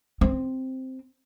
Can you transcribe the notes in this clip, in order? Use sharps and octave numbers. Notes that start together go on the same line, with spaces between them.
C4